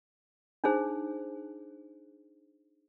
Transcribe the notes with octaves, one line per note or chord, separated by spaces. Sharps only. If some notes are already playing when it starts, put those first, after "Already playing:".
D4 D#4 G#4 C5